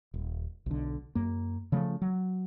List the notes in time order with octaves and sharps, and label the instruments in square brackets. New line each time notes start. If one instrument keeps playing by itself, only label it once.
[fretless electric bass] D#1
B1 D3
F#2 A#3
C#3 F3 A3
F#3